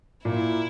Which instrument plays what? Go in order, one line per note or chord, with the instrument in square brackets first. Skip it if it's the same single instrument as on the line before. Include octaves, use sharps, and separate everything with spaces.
[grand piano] A#2 A#3 [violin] E4